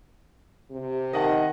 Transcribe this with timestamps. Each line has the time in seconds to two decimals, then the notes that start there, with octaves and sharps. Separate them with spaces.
0.71 C3
1.13 D#3 D#5 F#5 A5